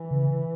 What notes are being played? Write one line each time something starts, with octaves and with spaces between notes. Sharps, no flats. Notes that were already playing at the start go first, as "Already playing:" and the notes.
Already playing: E3
C#3